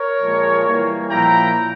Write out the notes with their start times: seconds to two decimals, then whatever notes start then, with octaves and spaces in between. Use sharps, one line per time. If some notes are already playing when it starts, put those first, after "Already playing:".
Already playing: A#4 C#5
0.20 A#2 F3 G#3
0.65 E3 G3 A#3 E4
1.09 A#2 F3 A#3 E4 G5 A#5